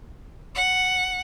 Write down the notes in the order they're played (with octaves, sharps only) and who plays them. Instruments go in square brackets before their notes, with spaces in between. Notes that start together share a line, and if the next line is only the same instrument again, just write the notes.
[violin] F#5